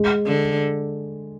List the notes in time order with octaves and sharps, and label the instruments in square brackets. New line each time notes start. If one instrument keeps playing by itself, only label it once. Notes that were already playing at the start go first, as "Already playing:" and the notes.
Already playing: [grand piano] G#3
[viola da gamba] D3